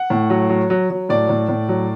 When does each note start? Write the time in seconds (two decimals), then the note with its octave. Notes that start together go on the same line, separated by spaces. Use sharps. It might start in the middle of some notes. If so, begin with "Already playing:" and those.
Already playing: F#5
0.10 A2
0.30 F#3
0.49 F#3
0.70 F#3
0.90 F#3
1.09 A2 D5
1.29 A2
1.49 A2
1.69 F#3